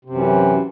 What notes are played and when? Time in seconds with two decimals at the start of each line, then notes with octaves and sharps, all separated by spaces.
0.05 C3
0.10 F#2
0.15 E3